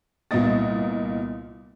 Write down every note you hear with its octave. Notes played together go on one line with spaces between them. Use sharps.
C2 A#2 A#3 B3 D#5 A6